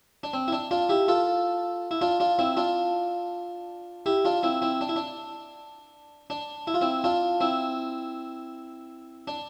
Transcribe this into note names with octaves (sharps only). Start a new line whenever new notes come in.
D4
C4
E4
D4
D4 F4
E4 G4
F4 A4
E4
D4 F4
D4 F4
C4 E4
D4 F4
E4 G4
D4 F4
C4 E4
C4 E4
D4
E4
D4
D4
E4
F4
C4 E4
D4 F4
C4 E4
D4